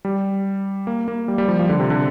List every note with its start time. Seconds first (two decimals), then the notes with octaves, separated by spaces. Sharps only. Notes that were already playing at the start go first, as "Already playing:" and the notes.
0.05 G3
0.87 A#3
1.08 A#3
1.28 G3
1.38 G3
1.48 F3
1.59 F3
1.69 D3
1.80 C3
1.90 D3